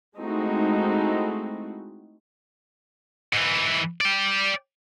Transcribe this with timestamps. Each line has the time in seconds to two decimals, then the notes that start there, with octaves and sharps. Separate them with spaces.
0.16 G#3 A3 C4 D#4 E4 F#4
3.33 G#2 E3
4.01 D5 G5